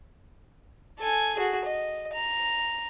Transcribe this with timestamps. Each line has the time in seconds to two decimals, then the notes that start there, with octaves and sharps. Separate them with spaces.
0.99 A4 G#5
1.36 F#4 G#4
1.65 D#5
2.13 A#5